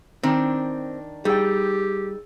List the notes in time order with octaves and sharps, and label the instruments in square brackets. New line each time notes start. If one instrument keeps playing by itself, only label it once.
[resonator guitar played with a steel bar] D#3 D4 [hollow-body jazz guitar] C4
[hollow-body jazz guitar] G3 [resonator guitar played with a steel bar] D#4 G5 [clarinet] G4 [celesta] G#4 E6 A6